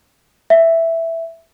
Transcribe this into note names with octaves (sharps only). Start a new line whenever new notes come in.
E5